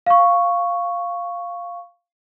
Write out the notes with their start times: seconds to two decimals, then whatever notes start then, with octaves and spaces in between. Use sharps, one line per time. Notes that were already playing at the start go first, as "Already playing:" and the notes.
0.06 F5 C#6